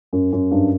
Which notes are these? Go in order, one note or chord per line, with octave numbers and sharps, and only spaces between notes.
F#2
F#2
G2